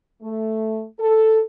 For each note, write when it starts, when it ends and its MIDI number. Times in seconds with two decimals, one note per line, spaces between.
0.22 0.84 57
0.99 1.41 69